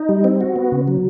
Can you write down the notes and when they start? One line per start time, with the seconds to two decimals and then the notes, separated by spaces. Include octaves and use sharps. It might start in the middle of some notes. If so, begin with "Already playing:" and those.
Already playing: D#4
0.09 G3
0.24 C4
0.41 F#4
0.56 B3
0.72 C#3
0.88 F#3